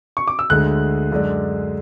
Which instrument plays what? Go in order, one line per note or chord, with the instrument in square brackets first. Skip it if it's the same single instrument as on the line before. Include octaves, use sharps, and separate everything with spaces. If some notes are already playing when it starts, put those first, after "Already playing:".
[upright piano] C#6
D6
E6
[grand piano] D2 D3 G#3 [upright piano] F#6
[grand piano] F#2 D3 G#3 D4